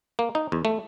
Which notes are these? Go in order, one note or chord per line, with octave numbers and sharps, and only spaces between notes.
A#3
D#4
E2
A3